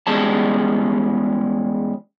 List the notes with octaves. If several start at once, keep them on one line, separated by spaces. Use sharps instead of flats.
E2 G3 G#3 C#4 A5